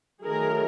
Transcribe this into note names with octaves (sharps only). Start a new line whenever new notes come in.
D#3 F#3 A3 G#4 A#4